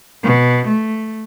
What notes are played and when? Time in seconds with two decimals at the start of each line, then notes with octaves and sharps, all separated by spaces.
0.24 B2
0.67 A3